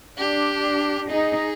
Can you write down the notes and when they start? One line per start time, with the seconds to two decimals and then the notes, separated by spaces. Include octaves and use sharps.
0.18 D4 G4
1.09 D#4 G#4